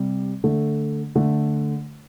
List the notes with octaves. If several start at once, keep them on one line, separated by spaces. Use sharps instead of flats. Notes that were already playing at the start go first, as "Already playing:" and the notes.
Already playing: C3 G3
D3 A3
D3 A3